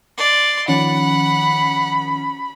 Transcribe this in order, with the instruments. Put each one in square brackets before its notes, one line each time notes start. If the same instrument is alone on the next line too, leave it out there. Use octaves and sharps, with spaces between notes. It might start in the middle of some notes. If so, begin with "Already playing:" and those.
[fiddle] D5 C6
[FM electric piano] D#3 F3 C#4 [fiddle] F#5 [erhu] B5